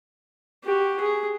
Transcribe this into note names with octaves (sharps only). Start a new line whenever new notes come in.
F#4 G4
G#4